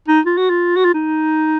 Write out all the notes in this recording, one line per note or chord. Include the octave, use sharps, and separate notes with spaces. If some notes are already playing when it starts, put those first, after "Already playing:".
D#4
F4
F#4
F4
F#4
F4
D#4